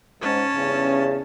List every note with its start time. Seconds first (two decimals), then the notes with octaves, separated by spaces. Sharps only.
0.21 G#2 C#4 A5
0.55 E2 G2 C#3